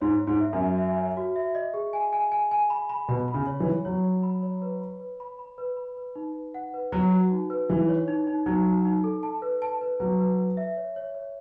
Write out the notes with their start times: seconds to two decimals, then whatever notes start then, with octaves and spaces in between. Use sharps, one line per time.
0.01 G#2 C#5
0.21 C#5
0.27 G#2
0.40 E5
0.53 F#2
0.58 F#4
0.78 E5
0.98 C#5
1.17 F#4
1.36 E5
1.55 D#5
1.74 G#4
1.93 G#5
2.13 G#5
2.32 G#5
2.51 G#5
2.70 B5
2.89 B5
3.08 B2 B5
3.28 B5
3.34 C#3
3.47 C#5
3.60 E3
3.65 C#5
3.85 F#3 C#5
4.04 C#5
4.23 B5
4.43 C#5
4.62 B4
4.81 B5
5.00 B4
5.20 B5
5.39 B5
5.58 B4
5.77 B5
5.97 B4
6.16 D#4
6.35 B4
6.54 F#5
6.74 B4
6.92 F#3 F#4
7.12 F#4
7.31 D#4
7.50 B4
7.69 E3 D#4
7.88 C#5
8.08 D#4
8.27 D#4
8.46 F#3 D#4
8.65 D#4
8.85 D#4
9.04 A4
9.23 A5
9.42 B4
9.62 A5
9.81 B4
10.00 F#3 B4
10.19 B4
10.37 B4
10.57 E5
10.77 C#5
10.96 C#5
11.15 C#5